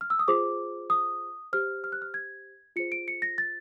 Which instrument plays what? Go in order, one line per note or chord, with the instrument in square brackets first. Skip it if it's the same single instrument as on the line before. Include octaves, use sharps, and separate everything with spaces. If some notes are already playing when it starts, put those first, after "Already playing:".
[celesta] F6
E6
D#6
F4 G#4 C5 D6
D#6
G4 C5 F6
F6
F#6
F6
G#6
F4 G#4 C5 C#7
D7
C#7
A#6
A6